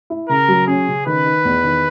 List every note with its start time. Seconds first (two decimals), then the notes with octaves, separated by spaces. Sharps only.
0.10 E4
0.29 C#3 A#4
0.48 F#3
0.67 C#4 G#4
0.87 C#3
1.06 D#3 B4
1.26 D#4
1.45 E2
1.64 D#3